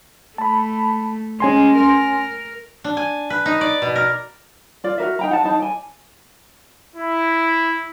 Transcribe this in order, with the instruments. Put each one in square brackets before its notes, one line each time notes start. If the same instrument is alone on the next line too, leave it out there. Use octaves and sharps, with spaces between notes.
[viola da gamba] A3 [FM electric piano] A5 B5
[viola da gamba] G#3 [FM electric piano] C#4 G#5 C6
[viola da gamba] A#4
[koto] D4
G#5
B4
D#4
D5
B2
A#4
[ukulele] F4 D5
F#4 A#4 E5
D#4 G5 A#5
F#5 A5
D#4 A5
D5 G#5
[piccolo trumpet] E4